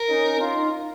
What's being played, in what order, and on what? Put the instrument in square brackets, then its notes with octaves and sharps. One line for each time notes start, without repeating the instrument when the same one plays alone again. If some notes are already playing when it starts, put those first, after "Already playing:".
Already playing: [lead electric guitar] A#4
[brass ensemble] C#4 D#4
D#4 F4